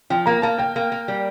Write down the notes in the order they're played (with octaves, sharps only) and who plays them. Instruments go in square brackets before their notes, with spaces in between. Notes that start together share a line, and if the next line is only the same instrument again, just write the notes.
[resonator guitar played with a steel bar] F3 [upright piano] G5
[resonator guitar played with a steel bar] A#3 [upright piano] A#5
[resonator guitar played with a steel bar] A#3 [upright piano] A5
[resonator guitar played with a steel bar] A#3 [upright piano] G5
[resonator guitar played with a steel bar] A#3
A#3
G3